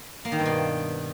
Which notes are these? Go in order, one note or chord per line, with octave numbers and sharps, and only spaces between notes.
A#3
D#3
G2
B2